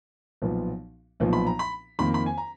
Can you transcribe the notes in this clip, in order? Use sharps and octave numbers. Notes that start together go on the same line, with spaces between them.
B1 A#2 F3 B3
B1 A#2 F3 B3
B5
A#5
B5
F2 D#3 A#3 B5
B5
G#5
A#5